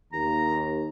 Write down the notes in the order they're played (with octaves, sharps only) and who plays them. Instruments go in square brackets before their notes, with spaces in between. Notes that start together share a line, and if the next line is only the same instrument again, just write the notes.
[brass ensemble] D#2 [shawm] A#5